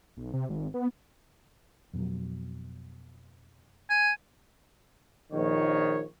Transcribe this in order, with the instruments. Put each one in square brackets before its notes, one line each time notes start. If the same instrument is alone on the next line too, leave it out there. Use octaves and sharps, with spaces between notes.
[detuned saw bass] B1
C3
G#1
B3
[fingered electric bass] F2 B2 F#3
[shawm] G#5
[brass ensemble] A#1 D#3 C#5